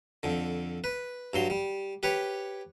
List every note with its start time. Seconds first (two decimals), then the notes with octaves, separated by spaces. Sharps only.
0.23 F2 D3
0.84 B4
1.33 G2 F#3 C6
1.50 G3
2.03 G4 B4 C#5